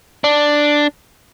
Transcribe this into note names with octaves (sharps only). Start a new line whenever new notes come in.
D4